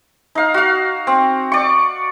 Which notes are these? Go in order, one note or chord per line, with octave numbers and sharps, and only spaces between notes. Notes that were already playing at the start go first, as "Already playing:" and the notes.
D#4 F5
F#4 F5
C4
D5 C#6